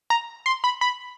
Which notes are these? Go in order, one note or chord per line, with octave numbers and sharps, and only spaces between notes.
A#5
C6
B5
B5